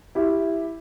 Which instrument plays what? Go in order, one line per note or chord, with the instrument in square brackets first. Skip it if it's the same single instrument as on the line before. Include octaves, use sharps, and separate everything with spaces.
[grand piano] E4 G4